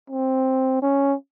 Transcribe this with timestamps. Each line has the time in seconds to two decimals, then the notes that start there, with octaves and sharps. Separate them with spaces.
0.10 C4
0.82 C#4